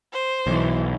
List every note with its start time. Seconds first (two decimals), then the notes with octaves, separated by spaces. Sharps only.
0.13 C5
0.47 B1 E3